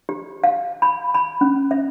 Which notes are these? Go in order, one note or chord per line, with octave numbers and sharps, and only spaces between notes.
G4
F5
B5
B5
C#4
E5